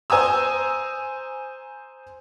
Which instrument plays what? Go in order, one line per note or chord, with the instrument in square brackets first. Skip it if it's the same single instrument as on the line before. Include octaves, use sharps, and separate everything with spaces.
[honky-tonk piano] C5 G#5 A#5 D#6 E6